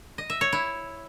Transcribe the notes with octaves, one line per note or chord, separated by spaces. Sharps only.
D#5
E5
C#5
E4